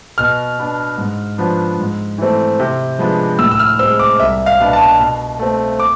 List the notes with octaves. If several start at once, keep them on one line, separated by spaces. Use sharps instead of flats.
B2 F6
B3 D4
G#2
F3 B3 D4
G#2
E3 A3 C4
C3
F3 G#3 B3 D4
A2 E6
E6
F6
G#3 C4 E6
D6
C2 E5
F5
B2 B3 D4
A5
B2
A3 C4
D6